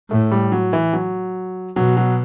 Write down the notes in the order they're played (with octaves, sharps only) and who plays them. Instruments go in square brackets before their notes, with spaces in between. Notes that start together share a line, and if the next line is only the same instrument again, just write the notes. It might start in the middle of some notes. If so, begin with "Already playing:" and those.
[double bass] A2 [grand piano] A3
[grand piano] G3
F#3
E3
F#3
[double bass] B2 [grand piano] F#3
[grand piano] F#3